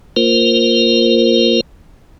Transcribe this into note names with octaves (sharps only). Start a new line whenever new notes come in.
A#3 F4 A#4 C5